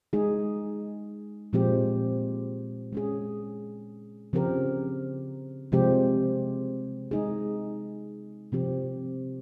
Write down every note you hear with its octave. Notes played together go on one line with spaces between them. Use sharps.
G#3 D#4 G#4
A#2 F3 G#3 C4 G4
G#3 C#4 G#4
C#3 F3 C4 G4 A#4
C3 F3 G#3 C4 G4
G#3 D#4 G#4
C3 F3 C4 G4